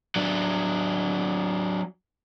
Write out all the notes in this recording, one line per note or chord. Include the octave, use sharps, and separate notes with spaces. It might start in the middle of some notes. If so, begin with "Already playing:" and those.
F#3 D4